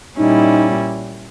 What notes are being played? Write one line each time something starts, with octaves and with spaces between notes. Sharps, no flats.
A#2 G3 C#4 D#4 E4